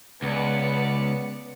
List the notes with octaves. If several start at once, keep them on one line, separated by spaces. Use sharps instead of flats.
C#2 B3 D5 C#7